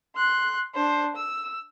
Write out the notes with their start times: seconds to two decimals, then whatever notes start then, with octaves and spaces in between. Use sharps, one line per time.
0.16 C6 F#6
0.75 D4 C5
1.16 E6